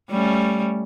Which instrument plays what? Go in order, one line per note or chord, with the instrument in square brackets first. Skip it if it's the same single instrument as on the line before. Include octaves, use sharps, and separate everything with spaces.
[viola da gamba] G3 A3 C#4